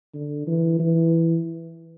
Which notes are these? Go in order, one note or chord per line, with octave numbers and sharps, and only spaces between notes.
D3
E3
E3